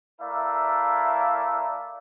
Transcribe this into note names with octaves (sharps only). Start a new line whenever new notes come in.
A3 E4 A#4 D5 E5 F5